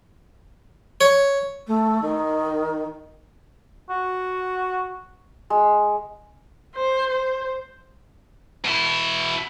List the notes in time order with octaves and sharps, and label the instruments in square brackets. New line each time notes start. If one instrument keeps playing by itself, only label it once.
[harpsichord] C#5
[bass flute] A3
D#3
[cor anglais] F#4
[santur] G#3
[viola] C5
C5
[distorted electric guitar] B2 E4